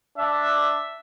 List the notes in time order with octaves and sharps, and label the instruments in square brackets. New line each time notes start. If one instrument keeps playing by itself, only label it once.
[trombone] D4 [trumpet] E5